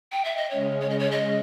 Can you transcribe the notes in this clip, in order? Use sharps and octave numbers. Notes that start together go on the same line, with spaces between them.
G5
E5
D#5
C#3 G#3 C#4 C#5
C#5
D#5
C#5
D#5